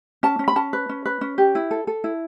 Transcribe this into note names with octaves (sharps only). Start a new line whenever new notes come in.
C#4 A5
C#4
B5
C#4 A5
B4
C#4
B4
C#4
G4
E4
A4
A4
E4